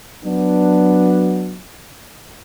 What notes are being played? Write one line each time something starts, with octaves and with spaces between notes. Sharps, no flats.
F#3 B3 D4